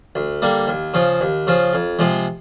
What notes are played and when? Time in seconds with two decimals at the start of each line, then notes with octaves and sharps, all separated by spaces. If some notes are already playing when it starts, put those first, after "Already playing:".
0.15 D2
0.42 D3 G3 A#3
0.68 D#2
0.94 C#3 F3
1.21 D#2
1.47 C#3 F3
1.73 F2
1.99 C3 F3 G#3